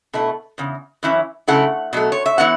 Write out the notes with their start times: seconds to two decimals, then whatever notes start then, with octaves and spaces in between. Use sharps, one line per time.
0.13 B2 A3 E4
0.58 E2 C#3
1.03 F#2 E3 C#4 E4
1.48 C#3 F#3 A3 E4 F#5
1.93 B2 F#3 A3
2.12 C#5
2.26 E5
2.38 E3 B3 E4 F#5